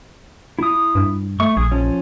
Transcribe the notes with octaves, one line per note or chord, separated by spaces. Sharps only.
E4 D#6
G2
A3 C#6
A#1 G#4
F3 C#4